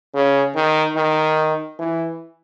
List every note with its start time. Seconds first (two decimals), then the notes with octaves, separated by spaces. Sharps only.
0.14 C#3
0.55 D#3
0.96 D#3
1.79 E3